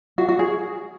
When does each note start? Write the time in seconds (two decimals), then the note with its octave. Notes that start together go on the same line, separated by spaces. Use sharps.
0.18 F#4
0.29 F#4
0.39 G#4